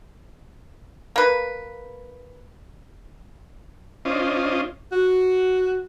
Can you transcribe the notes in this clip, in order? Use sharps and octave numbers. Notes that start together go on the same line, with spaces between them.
A#3 B4
C#4 D4 F4 C5 D#5
F#4